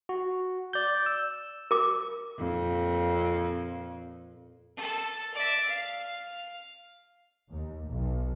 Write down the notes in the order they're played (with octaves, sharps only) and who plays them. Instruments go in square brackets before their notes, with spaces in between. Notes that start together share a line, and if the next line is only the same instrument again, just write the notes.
[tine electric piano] F#4
D5 G6
E6
[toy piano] A#4 D6
[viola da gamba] F2 A#2
[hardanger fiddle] A4
D5 E5
F5
[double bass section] D#2
B1